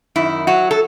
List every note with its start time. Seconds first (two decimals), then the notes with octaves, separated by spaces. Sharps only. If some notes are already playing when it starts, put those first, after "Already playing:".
0.15 F#2 D#3 E4
0.47 F#3 F#4
0.71 A4